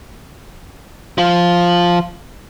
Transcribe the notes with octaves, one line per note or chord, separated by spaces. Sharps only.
F3 F4